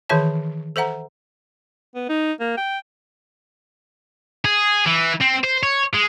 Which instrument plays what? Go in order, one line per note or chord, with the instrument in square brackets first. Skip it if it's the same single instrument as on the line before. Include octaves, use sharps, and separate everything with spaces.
[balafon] D#3 E3 G#4 C#5 E5 A5
A4 C5 E5 F#5 A#5
[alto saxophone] B3
D#4
A#3
G5
[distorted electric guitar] G#4
E3
C4
C5
C#5
G#3